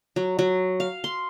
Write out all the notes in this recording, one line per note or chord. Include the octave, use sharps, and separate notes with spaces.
F#3
F#3
F5
C6